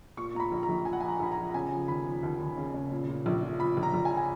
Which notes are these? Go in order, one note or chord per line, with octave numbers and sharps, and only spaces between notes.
A#2 C#6
A#2 A#5
B5
A#1
A#5
A#1
F3 G#5
F#5
G#5
F3
A#5
A#1 B5
A#5
F3
A#5
C#3 G#5
F3
D#2 B5
F3
D#2
D#2
C#3
C#3
A#2
A#2
A#1
A#2
F3 B5
A#1
A#5
A#1
G#5
F3
G#5